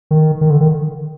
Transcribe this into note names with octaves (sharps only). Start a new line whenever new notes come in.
D#3
D#3
D3
D#3